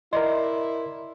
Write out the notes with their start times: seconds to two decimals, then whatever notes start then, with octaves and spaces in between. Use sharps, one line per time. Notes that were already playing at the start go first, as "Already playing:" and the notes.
0.13 E4 A#4 D5 D#5 C6